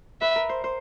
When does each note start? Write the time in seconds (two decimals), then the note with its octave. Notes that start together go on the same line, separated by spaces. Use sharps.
0.21 B4 E5
0.36 A#4
0.49 C5
0.64 C5